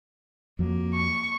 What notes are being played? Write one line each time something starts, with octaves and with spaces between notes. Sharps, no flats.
F2 F#3 A#3
C#6